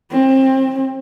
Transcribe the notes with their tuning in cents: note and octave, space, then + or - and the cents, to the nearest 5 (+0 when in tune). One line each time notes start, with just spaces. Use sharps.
C4 +25